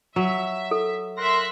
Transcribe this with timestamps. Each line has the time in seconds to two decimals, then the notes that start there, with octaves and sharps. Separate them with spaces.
0.16 F#3 E5
0.71 A4
1.18 A#4 E5 C6 F#6 A#6